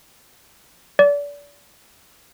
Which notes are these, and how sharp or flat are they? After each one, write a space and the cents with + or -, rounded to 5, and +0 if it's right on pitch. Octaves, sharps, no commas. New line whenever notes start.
D5 -30